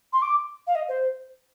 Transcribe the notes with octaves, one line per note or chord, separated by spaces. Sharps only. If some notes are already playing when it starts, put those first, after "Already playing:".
C6
D6
F5
D#5
C5